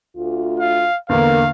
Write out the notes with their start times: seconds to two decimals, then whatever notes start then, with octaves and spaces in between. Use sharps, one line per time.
0.17 D2 F4
0.60 F5
1.09 E2 D3 A#3 A#4 F5